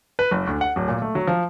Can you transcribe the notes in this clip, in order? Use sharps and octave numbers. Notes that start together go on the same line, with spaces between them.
B4
F#1
D2
F#5
D1
A#2
A3
F#3
F3